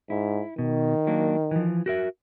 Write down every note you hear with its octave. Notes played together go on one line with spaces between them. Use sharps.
G#2 E4
B2 D#3
F#3 A#3 D4
E3 F3
F#4 A#4 E5